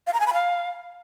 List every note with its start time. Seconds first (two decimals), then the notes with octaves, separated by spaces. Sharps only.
0.07 F5
0.14 A#5
0.20 G#5
0.27 B5
0.33 F5